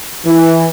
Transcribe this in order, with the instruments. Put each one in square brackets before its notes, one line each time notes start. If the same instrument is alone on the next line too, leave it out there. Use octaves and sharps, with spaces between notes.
[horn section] E3